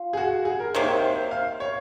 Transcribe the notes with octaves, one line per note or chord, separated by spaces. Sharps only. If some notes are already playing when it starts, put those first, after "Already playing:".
Already playing: F4
G#4
F#4
G#4
A#4
C3 D#3 A#3 C#5
C5
A#4
C5
F5
C#5